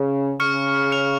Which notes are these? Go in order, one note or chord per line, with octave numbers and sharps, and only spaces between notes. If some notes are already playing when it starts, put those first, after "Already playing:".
Already playing: C#3
C#3 C#6 F6 C#7
F6 C#7 F7